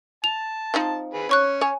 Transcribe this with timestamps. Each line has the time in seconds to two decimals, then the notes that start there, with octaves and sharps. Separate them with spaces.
0.24 A5 F7
0.74 F3 C4 D#4
1.14 G#4 B4
1.29 C#4 C#5 C#6 F#6
1.61 C#5 G#5